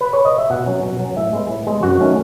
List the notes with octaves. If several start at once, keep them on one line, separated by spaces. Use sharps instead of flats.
B4
C#5
D#5
E5
B2 F#5
F#3 C#4
B2
F#3 C#4
A2 E5
G#3 B3
A2
G#3 B3
F#2 F#4
D#3 A3 C#4